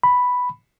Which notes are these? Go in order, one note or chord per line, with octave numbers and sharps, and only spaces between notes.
B5